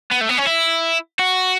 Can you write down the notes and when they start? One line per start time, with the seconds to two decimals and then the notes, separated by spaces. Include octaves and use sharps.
0.11 B3
0.21 A3
0.29 B3
0.38 C#4
0.47 E4
1.19 F#4